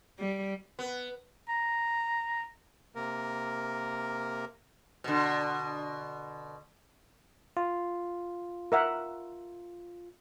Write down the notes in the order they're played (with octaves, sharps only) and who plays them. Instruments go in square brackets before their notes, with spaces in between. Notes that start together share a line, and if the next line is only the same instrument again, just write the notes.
[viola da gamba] G3
[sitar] B3
[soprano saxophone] A#5
[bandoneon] C3 A#3 A#4
[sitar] B2 D3
[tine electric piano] F4
[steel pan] A#4 E5 F#5